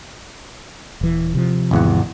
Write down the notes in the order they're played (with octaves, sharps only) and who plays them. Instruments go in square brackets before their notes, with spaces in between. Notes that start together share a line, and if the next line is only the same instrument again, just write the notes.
[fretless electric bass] D#1 E3
C3 F3
[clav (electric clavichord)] G#1 E2 F#5